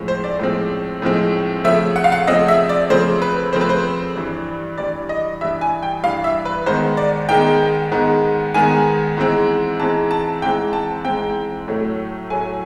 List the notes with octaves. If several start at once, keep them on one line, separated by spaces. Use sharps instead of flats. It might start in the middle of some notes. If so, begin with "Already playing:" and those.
Already playing: A2 F3 G#3 C4
C5
D5
A2 F3 G#3 C4
A2 F3 G#3 C4
C#3 F3 A3 C4 E5
F#5
F5
F#5
C#3 F3 A3 C4 D#5
E5
D5
C#3 F3 A3 C4 C5
B4
C#3 F3 A3 C4 C5
B4
C5
G2 E3 G3
G2 E3 G3 D5
D#5
G2 E3 G3 E5
G#5
G5
G2 E3 G3 F5
E5
B4
G#2 D#3 G#3 B3 C5
D5
G#2 D#3 G#3 B3 G5
G#2 D#3 G#3 B3
G#2 D#3 G#3 B3 G#5
G#2 E3 G#3 C4
G#2 E3 G#3 C4 A5
A5
G#2 E3 G#3 C4 G5
A5
G#2 E3 G#3 C4 G5
A2 F#3 A3
A2 F#3 A3 G#5